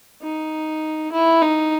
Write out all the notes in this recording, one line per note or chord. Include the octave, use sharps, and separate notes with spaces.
D#4
E4
D#4